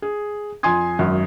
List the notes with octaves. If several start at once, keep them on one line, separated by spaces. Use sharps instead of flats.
G#4
F2 G#5 C6 D#6 G#6
G#1 F#2